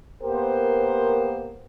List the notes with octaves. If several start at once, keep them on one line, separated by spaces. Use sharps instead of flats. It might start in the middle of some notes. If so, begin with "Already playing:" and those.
A#3 B3 G4 A#4 C5